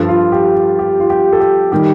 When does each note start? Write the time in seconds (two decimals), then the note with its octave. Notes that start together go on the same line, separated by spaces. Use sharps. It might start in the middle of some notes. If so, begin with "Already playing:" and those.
Already playing: G2 F3 A4
0.09 F4
0.32 G4
0.79 G4
1.00 F4
1.10 G4
1.33 A4
1.40 G4
1.72 D#3 G3 G4